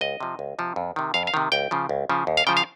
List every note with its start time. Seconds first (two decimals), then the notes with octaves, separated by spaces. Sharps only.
0.01 C#2 D#5
0.20 C3 F3
0.39 C#2
0.59 C3 F3
0.76 F2
0.96 C3 D#3
1.14 F2 F5
1.27 F5
1.34 C3 D#3
1.52 C#2 G5
1.71 C#3 F3
1.89 C#2
2.09 C#3 F3
2.27 D#2
2.37 F5
2.47 C#3 F3 G5
2.57 F5